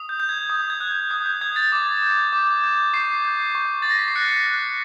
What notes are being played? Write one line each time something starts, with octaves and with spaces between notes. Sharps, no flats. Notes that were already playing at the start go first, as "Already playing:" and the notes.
Already playing: D#6
G6
G6
G#6
D#6
G#6
F#6
G6
D#6 G#6
G6
D#6 G#6
A6
D6
G6
D6
G6
C#6 C7
G6
C#6
C#6 A6
A#6
B6
C7
F#6 C#7
F#6